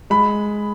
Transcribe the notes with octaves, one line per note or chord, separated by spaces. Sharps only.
G#3 B5